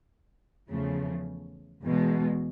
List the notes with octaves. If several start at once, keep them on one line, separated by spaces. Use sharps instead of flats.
E2 C#3 F3 A3
E2 B2 G#3